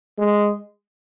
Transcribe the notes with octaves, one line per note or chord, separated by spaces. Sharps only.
G#3